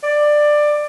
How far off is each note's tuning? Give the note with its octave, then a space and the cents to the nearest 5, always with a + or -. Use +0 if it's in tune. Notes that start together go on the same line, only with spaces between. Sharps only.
D5 +15